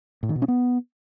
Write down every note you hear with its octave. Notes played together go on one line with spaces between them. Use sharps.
A2
D#3
B2
C#4
B3